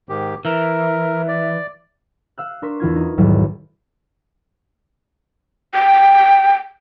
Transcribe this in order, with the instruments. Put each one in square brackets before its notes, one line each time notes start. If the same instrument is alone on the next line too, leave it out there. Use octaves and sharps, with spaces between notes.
[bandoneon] G#2 D#3 G4
[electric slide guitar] E3 [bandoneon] A#4 [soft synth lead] E5
[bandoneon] D5
[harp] F5 E6 F#6
D4 A#4 C6 C#6 B6 E7
E2 E3 F4 G#6
D#4
B1 E2 G#2 D#3 F#3 G3
[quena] G5